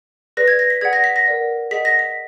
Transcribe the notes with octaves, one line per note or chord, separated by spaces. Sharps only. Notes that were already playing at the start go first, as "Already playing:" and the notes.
G#4 B4 D5 A#6
G#6
A#6
B6
G#4 D5 F#5 G#6
A#6
B6
A#6
A#4 D5 F#5
G#4 D#5 F#5 B6
A#6
B6